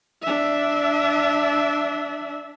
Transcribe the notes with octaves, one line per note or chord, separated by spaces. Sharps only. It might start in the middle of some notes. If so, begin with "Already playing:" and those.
D4 E5